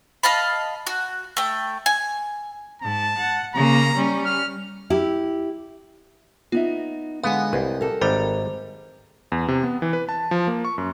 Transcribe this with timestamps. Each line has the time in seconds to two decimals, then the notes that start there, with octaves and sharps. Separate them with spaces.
0.23 D#5 F5 A5 B5
0.87 F#4
1.37 A3 G5
1.86 G#5
2.82 G#2 A5
3.17 F#5
3.55 C#3 A#3 A#5
3.95 G3 C#4
4.25 F6
4.90 E4 G4
6.52 B3 D#4 F4 E5
7.24 D3 G#3 B3 F5 F#5 G#5
7.53 C2 B4 C5 D#5
7.81 G4 A4 A#4
8.01 G#1 G3 C5 A#5
9.32 E2
9.48 C3
9.63 B3
9.82 E3
9.93 B4
10.09 A5
10.31 F3
10.47 A#3
10.65 C#6
10.78 F#2